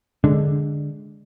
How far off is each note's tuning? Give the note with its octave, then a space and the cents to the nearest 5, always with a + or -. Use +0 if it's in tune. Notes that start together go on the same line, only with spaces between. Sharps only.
D3 +0 G#3 +0 D4 -5